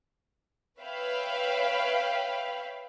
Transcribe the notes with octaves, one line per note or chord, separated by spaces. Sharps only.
B4 C#5 E5 F5 G5 B5